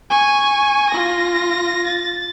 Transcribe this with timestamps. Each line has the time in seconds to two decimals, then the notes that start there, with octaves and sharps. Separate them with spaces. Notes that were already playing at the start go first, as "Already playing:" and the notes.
0.10 G#5 C#6
0.90 F4 A#6
1.87 A6